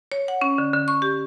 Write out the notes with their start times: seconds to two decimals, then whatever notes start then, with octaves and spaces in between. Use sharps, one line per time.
0.12 C#5
0.28 F#5
0.41 C#4
0.58 D3
0.73 D3
0.88 C#6
1.02 G4